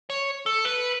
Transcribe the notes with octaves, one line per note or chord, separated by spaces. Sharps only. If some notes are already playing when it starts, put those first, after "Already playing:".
C#5
A4
B4